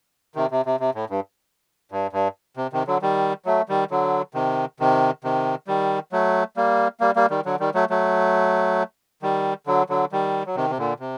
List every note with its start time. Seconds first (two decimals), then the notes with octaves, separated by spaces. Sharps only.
0.35 C3 D#3
0.51 C3
0.66 C3
0.80 C3
0.95 A2
1.10 G2
1.92 G2
2.13 G2
2.57 C3
2.73 C3 D#3
2.87 D3 F#3
3.02 D#3 G3
3.46 F#3 A3
3.69 D#3 G3
3.91 D3 F#3
4.34 C3 D#3
4.80 C3 D#3
5.24 C3 D#3
5.67 D#3 G3
6.12 F#3 A3
6.57 G3 A#3
7.00 G3 A#3
7.16 G3 A#3
7.30 D#3 G3
7.45 D3 F#3
7.60 D#3 G3
7.74 F#3 A3
7.90 F#3 A3
9.22 D#3 G3
9.67 D3 F#3
9.89 D3 F#3
10.12 D#3 G3
10.46 F#3
10.56 C3 D#3
10.70 C3
10.78 A#2 D3
11.00 C3